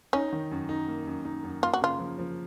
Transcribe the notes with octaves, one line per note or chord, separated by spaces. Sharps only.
C#4 D#4
D#3
F#2
D#4
A#3
F#2
D#4
F#2
A#3 F4
F#4
C#3 F4
F3
F3